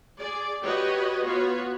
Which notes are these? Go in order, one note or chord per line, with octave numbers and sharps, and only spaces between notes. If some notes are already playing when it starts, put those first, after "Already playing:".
G#4 D5
F#4 G4 B4 C#5 D#5
B3 F4 F#4 B4 C#5